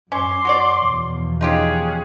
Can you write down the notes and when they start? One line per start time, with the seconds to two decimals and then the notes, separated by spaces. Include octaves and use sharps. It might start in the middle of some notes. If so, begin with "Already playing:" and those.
0.12 F#2 C#4 C6 D6
0.45 F#4 C#5 D5
0.78 E2 B2 F3
1.41 C#4 D#4 F4 G4 G#4 F#6